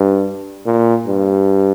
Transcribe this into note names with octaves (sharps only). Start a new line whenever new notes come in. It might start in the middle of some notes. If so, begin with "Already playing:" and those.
Already playing: G2
A#2
G2